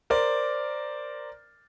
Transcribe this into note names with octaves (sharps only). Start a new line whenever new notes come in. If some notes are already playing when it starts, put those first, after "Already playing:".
A#4 C5 D5